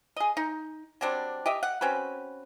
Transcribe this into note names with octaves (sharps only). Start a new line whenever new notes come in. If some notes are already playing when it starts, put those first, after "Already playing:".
G#4 D#5
D#4
F#3 G3 C4 D4
G4 D#5 E5
F#5
C4 C#4 F#4 B4